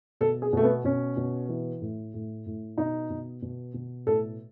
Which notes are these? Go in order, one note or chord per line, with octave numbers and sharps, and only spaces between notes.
B2 A4
G#4
B2 A3
B3
B2 C#4
B2
E3
A2
A2
A2
B2 D#4
B2
B2
B2
A2 A4